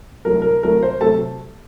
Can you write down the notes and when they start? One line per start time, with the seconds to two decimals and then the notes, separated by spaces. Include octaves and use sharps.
0.25 C2 C3 F#3 A3 A#4
0.42 A#4
0.63 C2 C3 F#3 A3 A#4
0.83 C5
1.01 C3 F#3 A3 A4 A5